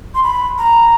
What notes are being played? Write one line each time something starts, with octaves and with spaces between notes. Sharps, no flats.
C6
B5
A#5